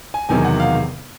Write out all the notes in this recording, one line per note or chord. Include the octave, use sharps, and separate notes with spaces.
G#5
E1 E2 C3 D#3 F#3 G#5
F#5
F5